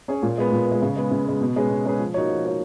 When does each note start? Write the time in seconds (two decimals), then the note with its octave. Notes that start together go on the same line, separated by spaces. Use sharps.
0.08 C#4 G#4 C#5
0.23 A#2
0.38 G#3 B3
0.52 A#2
0.66 G#3 B3
0.82 C#3
0.96 G#3 B3
1.11 C#3
1.26 G#3 B3
1.41 B2
1.56 G#3 C#4 G#4 B4
1.70 B2
1.85 G#3 C#4 G#4 B4
1.99 F3
2.14 A#3 D#4 F#4 C#5
2.29 F3
2.45 A#3 D#4 F#4 C#5